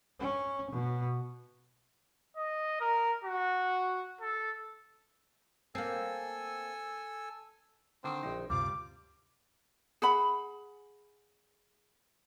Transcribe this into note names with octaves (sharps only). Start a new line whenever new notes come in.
C#4
B2
D#5
A#4
F#4
A4
A#3 C4 A4 G#5 E6
D3 D#3 C4
A#1 D#4
D2 G2 C3 G3 F4 F5 D6
G#4 F#5 B5